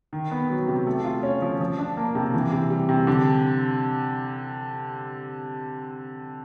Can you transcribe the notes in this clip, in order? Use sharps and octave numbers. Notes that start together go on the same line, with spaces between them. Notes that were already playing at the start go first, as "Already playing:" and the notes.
D#3
B3
F#3
C3
A3
F4
C#4
F3
F3
D4
A#3
C3
E3
C3
G3
C3
D3